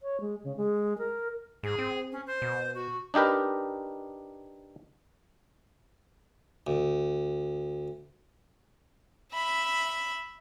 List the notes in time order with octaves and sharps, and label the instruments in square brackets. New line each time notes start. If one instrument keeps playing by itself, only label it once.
[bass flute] C#5
G#3
C#3
G#3
A#4
[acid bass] G#2 [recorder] G#4
[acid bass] C4
[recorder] C#4
C5
[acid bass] B2
[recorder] F#4
[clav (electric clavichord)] D4 D#4 G4 A#4 B4
[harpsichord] D2
[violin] E5 B5